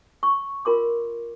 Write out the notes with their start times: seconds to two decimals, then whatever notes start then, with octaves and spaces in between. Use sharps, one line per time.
0.23 C#6
0.65 F4 A#4 C6 D6